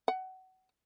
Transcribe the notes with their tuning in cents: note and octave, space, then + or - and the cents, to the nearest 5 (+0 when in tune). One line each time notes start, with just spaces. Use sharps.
F#5 +25